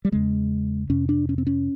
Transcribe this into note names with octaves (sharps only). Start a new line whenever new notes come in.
G3
E2 C#3 G#3
F2 C3 C#4
D4
C#4
C4
C#4